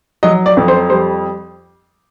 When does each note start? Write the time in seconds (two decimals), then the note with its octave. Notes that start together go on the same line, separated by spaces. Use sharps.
0.23 F#3 D#5
0.46 D5
0.57 F2
0.68 C5
0.90 G3 C5